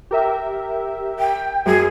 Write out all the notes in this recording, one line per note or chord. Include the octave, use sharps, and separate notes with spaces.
G4 A#4 E5
G5
F#2 G#4